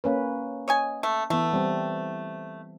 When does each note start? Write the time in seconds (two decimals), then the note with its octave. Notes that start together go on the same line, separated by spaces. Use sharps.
0.04 A#3 C#4 B4
0.68 C#5 D#5 G#5
1.03 A3
1.30 E3 A3 B3
1.53 G3 C4